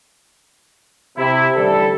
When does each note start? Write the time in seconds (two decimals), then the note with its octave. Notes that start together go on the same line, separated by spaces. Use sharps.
1.18 C3 E4
1.56 A1 D3 G3 G4 A4